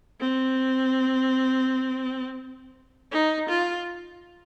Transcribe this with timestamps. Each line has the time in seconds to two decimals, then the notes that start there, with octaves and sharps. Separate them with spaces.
0.20 C4
3.12 D#4
3.49 F4